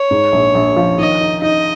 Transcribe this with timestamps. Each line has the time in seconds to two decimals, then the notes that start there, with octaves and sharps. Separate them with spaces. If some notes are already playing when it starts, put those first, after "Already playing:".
Already playing: C#5
0.11 G#2
0.32 A#1
0.55 A#1
0.76 F3
0.98 D#3 D#5
1.21 D#4
1.42 D#4 D#5